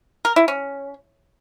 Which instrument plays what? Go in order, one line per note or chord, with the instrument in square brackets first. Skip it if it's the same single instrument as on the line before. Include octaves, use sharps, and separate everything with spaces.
[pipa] A#4
E4
C#4